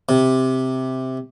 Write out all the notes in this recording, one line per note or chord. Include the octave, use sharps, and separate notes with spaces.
C3